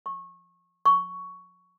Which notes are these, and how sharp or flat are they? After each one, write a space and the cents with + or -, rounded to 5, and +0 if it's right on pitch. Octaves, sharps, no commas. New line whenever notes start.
C#6 -25
C#6 +10